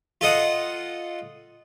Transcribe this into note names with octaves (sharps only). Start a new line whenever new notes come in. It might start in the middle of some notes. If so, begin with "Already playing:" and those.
F4 A4 D#5 F#5